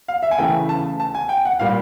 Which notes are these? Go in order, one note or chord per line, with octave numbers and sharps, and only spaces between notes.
F5
E5
G#5
C#3 E3 A3 G5
A5
A5
G#5
G5
F#5
A#2 G3 A#3 F5